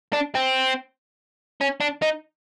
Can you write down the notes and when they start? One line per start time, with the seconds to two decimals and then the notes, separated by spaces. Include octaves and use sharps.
0.13 D4
0.35 C4
1.61 C#4
1.80 D4
2.02 D#4